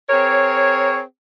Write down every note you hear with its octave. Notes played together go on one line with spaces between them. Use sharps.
C4 G#4 A#4 C#5